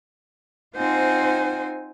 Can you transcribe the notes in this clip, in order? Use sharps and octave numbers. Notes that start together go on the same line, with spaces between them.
C4 D#4 F4 C5 F#5 G#5